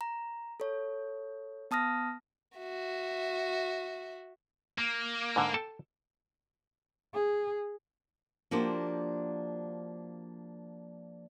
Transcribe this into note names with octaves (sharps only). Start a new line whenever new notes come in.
A#5
A4 C#5
B3 A5 D#6 F6 A#6
F#4 E5
A#3
G#2 D3
A4 G5 A5
G#4
F3 A#3 D4 F#4 G4 C5